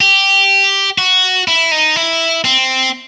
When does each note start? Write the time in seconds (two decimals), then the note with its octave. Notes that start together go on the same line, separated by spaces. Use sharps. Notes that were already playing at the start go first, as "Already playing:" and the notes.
0.01 G4
0.98 F#4
1.48 E4
1.71 D#4
1.96 E4
2.45 C4